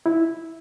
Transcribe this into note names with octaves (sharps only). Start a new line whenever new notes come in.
E4